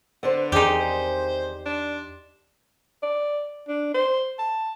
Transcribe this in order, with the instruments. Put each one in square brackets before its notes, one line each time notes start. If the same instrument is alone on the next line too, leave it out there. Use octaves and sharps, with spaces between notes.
[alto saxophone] D3 [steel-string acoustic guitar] B3 D4 C5
[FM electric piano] E2 D5 C6 [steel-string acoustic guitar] D#3 C4 G#4 [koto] D#4 G4
[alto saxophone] C5
D4
D5
D4
C5
A5